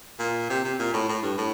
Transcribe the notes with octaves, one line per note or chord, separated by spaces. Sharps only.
A#2
C3
C3
A#2
A2
A2
G2
A2